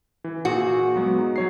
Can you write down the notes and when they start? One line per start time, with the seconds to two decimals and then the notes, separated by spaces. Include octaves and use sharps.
0.24 E3
0.45 A#2 F#4 G#4
0.96 F#3 G#3 B3
1.19 D#4
1.36 F#3 C#5 C7